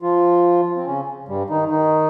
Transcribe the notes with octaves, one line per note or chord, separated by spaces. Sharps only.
F3 F4
C4
C#3 C#4
G2 G3
D#3 D#4
D#3 D#4